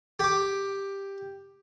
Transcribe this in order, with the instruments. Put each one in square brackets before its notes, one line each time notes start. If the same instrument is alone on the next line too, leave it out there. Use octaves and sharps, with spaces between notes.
[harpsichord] G4 D6